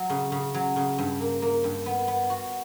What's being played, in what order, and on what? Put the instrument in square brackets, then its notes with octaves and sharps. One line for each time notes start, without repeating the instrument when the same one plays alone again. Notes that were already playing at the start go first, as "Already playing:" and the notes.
Already playing: [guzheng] F#3
C#3
C#3
F#3
C#3
G2
A#3
A#3
G2
B3
B3
F#4